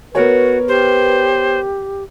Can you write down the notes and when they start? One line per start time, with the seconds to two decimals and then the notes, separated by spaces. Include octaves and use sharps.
0.15 B3 F#4 A#4 B4 C#5
0.68 G4 C5